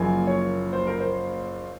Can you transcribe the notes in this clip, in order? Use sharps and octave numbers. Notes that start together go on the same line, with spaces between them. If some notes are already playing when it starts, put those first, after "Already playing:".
Already playing: F#1 F#2 F3 A#3 G#5
C#5
C5
A#4
C5